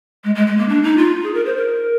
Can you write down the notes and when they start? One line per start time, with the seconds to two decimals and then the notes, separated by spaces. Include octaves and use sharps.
0.24 G#3
0.35 G#3
0.47 G#3
0.58 A#3
0.69 D4
0.83 D#4
0.97 F4
1.23 G#4
1.34 A#4
1.45 C5
1.57 A#4